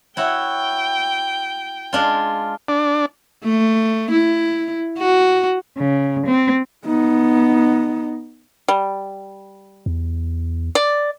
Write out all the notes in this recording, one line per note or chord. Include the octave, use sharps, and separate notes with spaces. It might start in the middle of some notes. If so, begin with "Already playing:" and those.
E4 F#4 C#5 G5
G#3 D4 F4
D4
A3
E4
F#4
C#3
C4
B3 D#4
G3
E2
D5